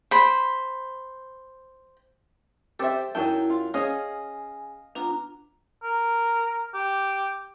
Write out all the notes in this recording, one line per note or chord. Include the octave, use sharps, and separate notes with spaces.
C5 B5
C4 G4 A4 C5 E5
F#2 F#3 D#4 E4 G5 A5
F4
C#4 G#4 C#5 D#5 F5 G#5
B3 D4 F4 A#5
A#4
G4